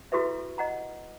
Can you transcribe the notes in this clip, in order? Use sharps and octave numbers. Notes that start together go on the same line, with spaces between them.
E4 F#4 G4 A4 B4 E5
D#5 F#5 A#5